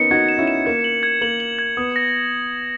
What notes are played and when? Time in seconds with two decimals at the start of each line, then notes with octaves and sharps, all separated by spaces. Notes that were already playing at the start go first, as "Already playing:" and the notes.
Already playing: A#3 B3 C#4 D#4 C#7
0.11 D#4 F#4 G#6
0.29 E7
0.38 C#4 E4
0.47 E7
0.66 A#3 G#6
0.84 F#7
1.03 G#6
1.21 A#3 F#7
1.40 F#7
1.59 G#6
1.77 B3 D#6
1.96 A#6